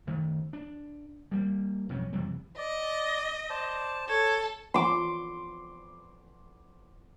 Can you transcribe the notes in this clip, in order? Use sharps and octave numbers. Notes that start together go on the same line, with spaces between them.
D#3 A3
D4
G3 G#3 A#3
B1 F2 C3 C#4
F2 C3 E3 G3
D5 D#5
C5 D5 A5
A4 C#5
C6 D6